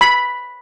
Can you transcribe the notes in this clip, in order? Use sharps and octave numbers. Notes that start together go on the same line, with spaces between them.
B5